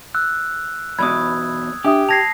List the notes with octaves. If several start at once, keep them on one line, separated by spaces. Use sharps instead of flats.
E6 F#6
B1 E2 B2 B5 D#6 E6 G#6
D4 G4 E5 D#6
A5 G#6 A#6 C7 F7